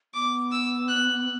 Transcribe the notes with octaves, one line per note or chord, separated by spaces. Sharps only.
B3 D6
E6
F#6